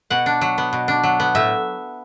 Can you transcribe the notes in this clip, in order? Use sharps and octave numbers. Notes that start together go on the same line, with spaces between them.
B2 F#5
D4
F#3
B3
B2
D4
F#3
B3
A2 E5